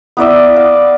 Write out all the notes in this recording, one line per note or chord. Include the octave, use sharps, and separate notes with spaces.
B3 E4 D5 E5
F5